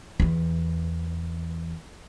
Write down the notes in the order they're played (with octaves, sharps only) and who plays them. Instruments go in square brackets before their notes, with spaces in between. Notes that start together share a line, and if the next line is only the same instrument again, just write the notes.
[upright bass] E2 E3